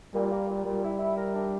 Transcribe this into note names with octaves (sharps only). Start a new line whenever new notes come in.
A#2 G3
A#3
A#2
A#2 G3
E4
E4
A#4
D4